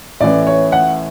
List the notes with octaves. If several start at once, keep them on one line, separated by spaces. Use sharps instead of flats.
A1 A2 E3 D5
C#5
F#5